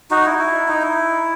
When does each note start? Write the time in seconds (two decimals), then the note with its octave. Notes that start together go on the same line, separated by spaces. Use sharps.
0.11 D#4 F#4
0.25 E4
0.39 E4
0.68 D#4
0.82 E4